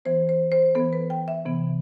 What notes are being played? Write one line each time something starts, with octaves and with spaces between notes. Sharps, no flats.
E3 B3 C5
C5
C5
E3 B3 A4
B4
G5
E5
C3 E3 B3